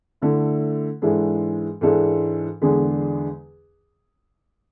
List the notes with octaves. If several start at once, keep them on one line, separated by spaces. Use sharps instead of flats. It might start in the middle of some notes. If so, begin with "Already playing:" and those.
D3 A3 E4 A4
G#2 E3 G#3 D4 A4
G#2 E3 G#3 D4 A4
E2 D3 G#3 D4 G#4